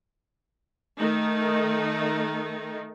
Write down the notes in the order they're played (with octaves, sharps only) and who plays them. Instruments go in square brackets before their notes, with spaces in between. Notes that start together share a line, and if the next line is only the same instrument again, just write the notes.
[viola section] D#3 A3 D#4